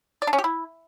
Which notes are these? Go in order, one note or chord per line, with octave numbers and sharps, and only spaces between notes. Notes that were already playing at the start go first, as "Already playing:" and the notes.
D5
D4
C#4
G4
E4